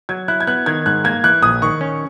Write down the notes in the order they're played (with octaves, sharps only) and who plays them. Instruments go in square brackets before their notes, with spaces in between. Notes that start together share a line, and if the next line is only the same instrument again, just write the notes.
[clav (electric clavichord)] F#3 [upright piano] G#6
[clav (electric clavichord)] E4 [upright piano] F#6
[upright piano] G#6
[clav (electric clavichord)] B3 [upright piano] F#6
[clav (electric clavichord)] D#3 [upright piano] G#6
[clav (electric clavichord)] G#2 [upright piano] F#6
[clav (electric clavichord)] A#3 [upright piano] G#6
[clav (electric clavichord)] E3 [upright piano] F#6
[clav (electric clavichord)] A#1 [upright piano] D#6
[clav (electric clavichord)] D#3 [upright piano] C#6
[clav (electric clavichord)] C#4